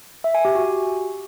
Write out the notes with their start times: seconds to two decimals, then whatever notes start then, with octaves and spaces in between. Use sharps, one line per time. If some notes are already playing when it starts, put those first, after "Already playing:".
0.24 E5
0.35 G#5
0.45 G4
0.55 F#4